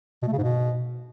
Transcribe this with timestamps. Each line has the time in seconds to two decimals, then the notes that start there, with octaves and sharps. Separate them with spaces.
0.22 B2
0.27 A3
0.33 C#3
0.38 G#2
0.43 B2